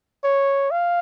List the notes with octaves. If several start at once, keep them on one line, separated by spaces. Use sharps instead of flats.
C#5
F5